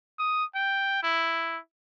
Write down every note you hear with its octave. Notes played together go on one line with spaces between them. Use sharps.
D#6
G5
E4